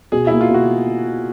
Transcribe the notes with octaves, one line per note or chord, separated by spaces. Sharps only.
B2 G#4
A#3 E4
F4
B2 F#4